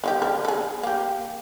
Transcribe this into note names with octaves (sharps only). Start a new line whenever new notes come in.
D#3 F4 G4
D3 A#4
G#4 A4
A#3 G4